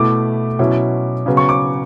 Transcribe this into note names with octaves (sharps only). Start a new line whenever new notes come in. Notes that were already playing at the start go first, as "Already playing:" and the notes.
Already playing: B2 A3 E4 D6
B2 F#3 C#4 E4
C#3 F#3 B3
C#6
D6